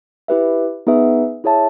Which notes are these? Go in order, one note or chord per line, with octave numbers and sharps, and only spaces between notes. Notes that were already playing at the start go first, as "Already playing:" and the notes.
E4 G4 B4 E5
B3 D#4 G#4 B4 E5
E4 G#4 C#5 E5 A5